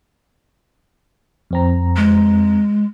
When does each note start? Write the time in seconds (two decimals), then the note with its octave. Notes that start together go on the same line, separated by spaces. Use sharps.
1.51 F2 C4 A#5
1.97 G#3